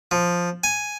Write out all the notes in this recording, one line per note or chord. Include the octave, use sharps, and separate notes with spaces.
F3
G#5